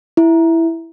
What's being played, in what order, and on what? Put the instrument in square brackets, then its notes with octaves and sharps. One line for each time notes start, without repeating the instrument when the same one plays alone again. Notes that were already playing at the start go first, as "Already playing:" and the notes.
[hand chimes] E4